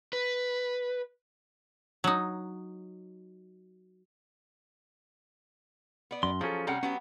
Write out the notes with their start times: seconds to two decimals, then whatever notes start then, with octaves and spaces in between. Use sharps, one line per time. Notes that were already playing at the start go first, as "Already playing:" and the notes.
0.13 B4
2.04 F#3 D#4
6.11 B3 D5
6.23 F#2 C6
6.41 F3 F#3 C#4 G#4 A4
6.67 C3 G3 C#4 F#5 G5 A#5
6.83 F#3 B3 C#4 G4